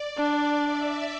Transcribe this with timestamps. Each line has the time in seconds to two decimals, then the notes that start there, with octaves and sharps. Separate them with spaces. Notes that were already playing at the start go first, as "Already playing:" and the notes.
Already playing: D5
0.17 D4 D5
0.63 E5